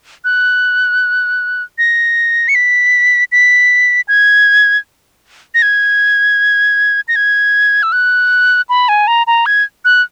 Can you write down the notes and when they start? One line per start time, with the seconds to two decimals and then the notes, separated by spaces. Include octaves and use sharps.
0.24 F#6
1.78 A#6
2.49 C#7
2.55 B6
3.32 B6
4.08 G#6
5.54 A#6
5.62 G#6
7.08 A#6
7.16 G#6
7.83 E6
7.92 F#6
8.69 B5
8.89 G#5
9.07 A#5
9.27 A#5
9.46 G#6
9.85 F#6